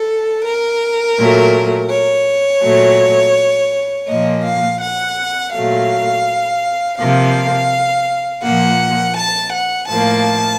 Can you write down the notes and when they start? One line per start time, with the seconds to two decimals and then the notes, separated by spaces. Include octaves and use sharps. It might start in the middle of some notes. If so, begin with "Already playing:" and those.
Already playing: A4
0.45 A#4
1.19 A#2 F#3 A3
1.90 C#5
2.63 A#2 F#3 A3
4.08 A#2 F3 A#3 D#5
4.44 F5
4.80 F#5
5.53 A#2 F#3 A3 F5
6.98 C3 F3 A#3 F5
8.43 A#2 F3 A#3 F#5
9.16 A5
9.52 F#5
9.88 A2 F3 A#3 A5